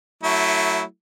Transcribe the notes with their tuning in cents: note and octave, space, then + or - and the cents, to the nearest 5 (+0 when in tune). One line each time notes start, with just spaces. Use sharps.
F#3 +5 A3 +15 E4 -15